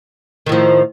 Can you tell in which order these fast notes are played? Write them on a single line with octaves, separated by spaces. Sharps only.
D#3 A2 F3